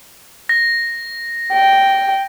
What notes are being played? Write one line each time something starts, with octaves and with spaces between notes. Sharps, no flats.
A#6
G5